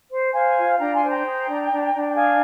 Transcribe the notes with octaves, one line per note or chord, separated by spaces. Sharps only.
C5
C5 F5 G#5
F4
D4 G5 A#5
G#5 C6
C5
G5 A#5
G#4
D4
D4
D4
G5
G#4 F5 G#5